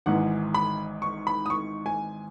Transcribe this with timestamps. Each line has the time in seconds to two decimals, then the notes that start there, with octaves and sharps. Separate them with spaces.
0.06 G#1 G#2 E3 F#5
0.54 B5
1.02 C#6
1.27 B5
1.46 D#6
1.50 C#6
1.86 G#5